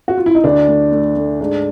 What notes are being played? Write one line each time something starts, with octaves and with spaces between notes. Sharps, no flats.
F#4
F4
E4
D#4
D2 D4
A3
A3
A3
G#2 D4